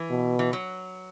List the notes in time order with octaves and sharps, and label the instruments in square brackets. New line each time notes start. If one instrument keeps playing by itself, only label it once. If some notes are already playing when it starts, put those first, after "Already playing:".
Already playing: [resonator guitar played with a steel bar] E3
[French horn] B2
[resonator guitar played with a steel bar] E3
F#3